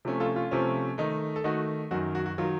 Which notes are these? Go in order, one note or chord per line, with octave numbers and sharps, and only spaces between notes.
C3 F3 A3 C#4
F4 A4
F4
C3 F3 A3 C#4
D#3 A3 D#4
A4
D#3 A3 D#4 F#4
F#2 D#3 F#3 F#4
F#4
F#4
D#3 F#3 F4